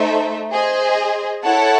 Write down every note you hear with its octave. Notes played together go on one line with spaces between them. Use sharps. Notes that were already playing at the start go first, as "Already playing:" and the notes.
Already playing: A3 D#4 A4 C5 E5
G#4 C5 D#5
E4 A4 C#5 F#5 A5